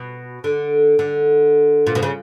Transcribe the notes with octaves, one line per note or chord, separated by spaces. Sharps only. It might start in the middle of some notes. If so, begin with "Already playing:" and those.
Already playing: B2
D3
D3
A#2
B2
C#3